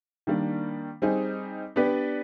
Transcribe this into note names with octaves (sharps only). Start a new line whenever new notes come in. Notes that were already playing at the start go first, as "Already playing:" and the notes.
D#3 G3 A#3 D4
G3 C4 D#4 G#4
B3 D4 G4 B4 D5